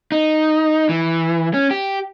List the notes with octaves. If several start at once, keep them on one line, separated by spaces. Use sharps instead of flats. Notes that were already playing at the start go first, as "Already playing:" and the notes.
D#4
E3
C#4
G4